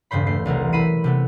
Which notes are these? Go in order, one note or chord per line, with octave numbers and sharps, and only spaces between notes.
E1 G2 C#3 C5 B5
A3 C7
C2 E3 F#3 A#4
E4 B5 C7 D#7
C3 A3 B3